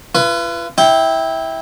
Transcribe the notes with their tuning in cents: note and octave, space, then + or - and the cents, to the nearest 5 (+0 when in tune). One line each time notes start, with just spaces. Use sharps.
F4 -45 B4 -5
E4 -15 G5 +0